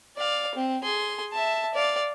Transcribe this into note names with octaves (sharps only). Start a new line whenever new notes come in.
D5 F5
C4
G#4 C6
E5 A5
D5 F5